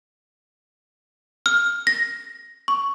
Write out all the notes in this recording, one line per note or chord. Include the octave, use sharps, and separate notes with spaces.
F6
A#6
C#6